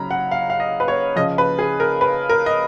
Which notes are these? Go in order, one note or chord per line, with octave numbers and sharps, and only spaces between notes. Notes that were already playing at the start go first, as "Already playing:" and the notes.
Already playing: C#3 F#3 A#5 B5
F#5
F5
F5
D#5
B4
C#5
C#3 F3 D#5
B4
G#4
A#4
B4
A#4
D#5